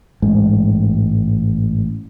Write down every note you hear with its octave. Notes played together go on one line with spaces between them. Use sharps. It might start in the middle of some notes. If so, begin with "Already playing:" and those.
A1 G#2 G#3